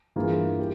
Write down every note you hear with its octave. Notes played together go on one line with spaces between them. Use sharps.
G2 E3 A#3 F4 G#4
G4